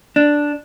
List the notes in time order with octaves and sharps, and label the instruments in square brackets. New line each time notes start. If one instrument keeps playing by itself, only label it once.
[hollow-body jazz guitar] D4